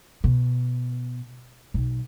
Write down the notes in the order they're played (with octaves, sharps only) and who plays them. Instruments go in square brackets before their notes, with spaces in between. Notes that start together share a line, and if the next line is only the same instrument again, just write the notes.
[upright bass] B2
B1